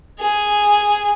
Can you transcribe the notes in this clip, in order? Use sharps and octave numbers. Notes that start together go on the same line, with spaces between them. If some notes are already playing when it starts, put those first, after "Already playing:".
G#4